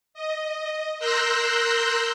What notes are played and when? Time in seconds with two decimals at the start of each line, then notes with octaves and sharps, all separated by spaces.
0.14 D#5
0.99 A#4 C6 E6 F#6 G6 A#6